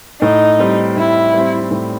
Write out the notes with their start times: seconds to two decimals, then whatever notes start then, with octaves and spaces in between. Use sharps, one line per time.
0.21 A2 D#4
0.59 G3 C4
0.96 A2 E4
1.34 G3 C4
1.71 A2